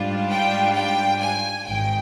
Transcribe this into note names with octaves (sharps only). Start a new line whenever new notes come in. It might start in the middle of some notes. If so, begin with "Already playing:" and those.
Already playing: G#2 G3 D4 F4
G5
G5
G#5
G#1 G#2 D#3 G5